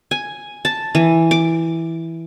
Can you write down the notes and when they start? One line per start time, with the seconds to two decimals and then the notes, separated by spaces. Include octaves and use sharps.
0.11 G#5
0.65 A5
0.95 E3
1.31 D6